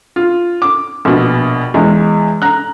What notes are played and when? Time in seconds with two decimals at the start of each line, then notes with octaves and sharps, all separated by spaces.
0.16 F4
0.62 D6
1.05 A#1 B2
1.74 E2 G#3
2.42 A#5 F#6